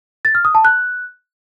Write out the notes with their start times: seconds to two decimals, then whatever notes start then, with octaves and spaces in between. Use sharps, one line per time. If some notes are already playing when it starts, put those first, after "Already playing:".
0.25 A6
0.35 F6
0.45 D#6
0.55 A5
0.65 F#6